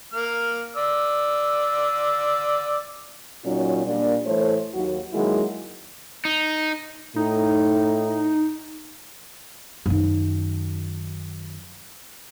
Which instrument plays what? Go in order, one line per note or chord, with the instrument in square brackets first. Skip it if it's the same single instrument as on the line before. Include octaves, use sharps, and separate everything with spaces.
[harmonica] A#3 F6
D5 E6
[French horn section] A#2 F#3 C#4 D#4 F4
A#2 G3 A#3 D4
A2 E3 A3 C5 C#5
D#2 F#3 F#4
D#3 F#3 G#3 A#3 E4 F#4
[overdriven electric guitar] D#4
[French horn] A2 [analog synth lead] D#4
[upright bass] F#2 D#3